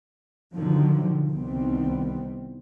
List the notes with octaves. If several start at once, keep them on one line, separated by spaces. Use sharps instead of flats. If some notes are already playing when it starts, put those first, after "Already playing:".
B2 D3 D#3 F3 F#3
C2 D#3 G3 B3 C4